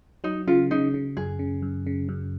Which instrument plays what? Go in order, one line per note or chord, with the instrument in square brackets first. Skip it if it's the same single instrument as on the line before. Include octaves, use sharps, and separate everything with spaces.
[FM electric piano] F#3 [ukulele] D#4
[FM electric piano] C#3 [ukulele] F4
[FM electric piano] C#3 [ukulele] D#4
[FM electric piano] C#3
[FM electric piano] F#2 [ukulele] G#4
[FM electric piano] C#3
F#2
C#3
F#2